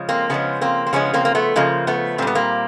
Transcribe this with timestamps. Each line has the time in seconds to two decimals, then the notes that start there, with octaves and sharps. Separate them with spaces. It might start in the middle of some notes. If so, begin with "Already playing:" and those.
Already playing: C#3 F3 G#3
0.09 A#3 C4
0.29 C#3 F3 G#3 B3 C#4
0.61 A#3 C4
0.87 C4
0.93 C#3 F3 G#3 B3 C#4
1.14 A#3 C4
1.25 A#3
1.35 A3 B3
1.56 C#3 F3 G#3 A#3
1.87 A3 B3
2.18 A#2 C4
2.22 G3 B3
2.35 A#3 C4